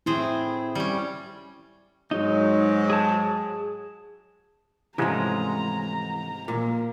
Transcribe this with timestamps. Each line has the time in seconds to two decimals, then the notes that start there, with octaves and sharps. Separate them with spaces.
0.06 A2 C4 E4 G#4
0.75 G3 C#4
2.11 G#2 F#3 D#4
2.90 G#4 A5
4.98 G#2 C3 E3 F3 G#3 A3 C#4 A#5
6.48 A#2 A#3